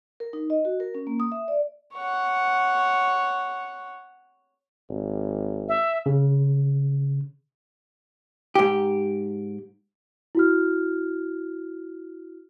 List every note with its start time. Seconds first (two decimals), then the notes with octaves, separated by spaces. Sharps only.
0.20 A#4
0.33 D#4
0.50 D#5
0.65 F#4
0.80 A#4
0.95 C#4
1.07 A#3
1.20 D#6
1.32 E5
1.48 D5
1.94 C#5 F#5
4.90 G#1
5.68 E5
6.06 C#3
8.55 G#2 G4
10.35 E4 F#4 F6